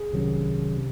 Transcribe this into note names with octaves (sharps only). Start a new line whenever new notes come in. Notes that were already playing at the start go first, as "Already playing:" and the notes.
Already playing: G#4
C2 C3 D#3 F#3 C#4
C3